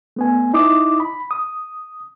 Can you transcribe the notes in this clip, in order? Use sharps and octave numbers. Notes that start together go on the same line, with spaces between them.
A3 B3 G#5
D#4 E4 D6 D#6
B5
D#6